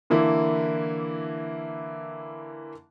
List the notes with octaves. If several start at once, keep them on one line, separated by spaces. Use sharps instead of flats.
D3 E3 A#3 E4